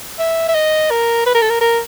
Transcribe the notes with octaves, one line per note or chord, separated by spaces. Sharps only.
E5
E5
D#5
A#4
B4
A#4
A4
A#4
A#4